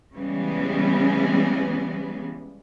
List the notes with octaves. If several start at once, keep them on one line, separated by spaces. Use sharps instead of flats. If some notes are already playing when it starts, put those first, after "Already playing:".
C#3 E3 G3 G#3 B3